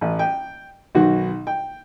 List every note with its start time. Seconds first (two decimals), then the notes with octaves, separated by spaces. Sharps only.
0.01 A1
0.19 G5
0.95 B1 D#3 F#4
1.47 G5